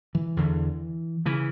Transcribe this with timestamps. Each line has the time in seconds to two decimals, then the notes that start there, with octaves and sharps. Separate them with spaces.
0.15 E3
0.37 E2 D3
1.26 C#3 E3